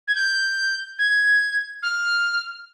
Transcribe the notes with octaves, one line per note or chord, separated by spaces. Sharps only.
G#6
G6
G#6
F6